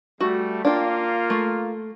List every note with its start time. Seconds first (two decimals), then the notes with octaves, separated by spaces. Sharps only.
0.21 G3 A3 F#4
0.65 A#3 D4 F4 G5
1.30 A3